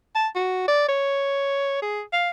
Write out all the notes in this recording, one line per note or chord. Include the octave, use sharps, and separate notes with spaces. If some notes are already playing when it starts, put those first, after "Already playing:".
A5
F#4
D5
C#5
G#4
F5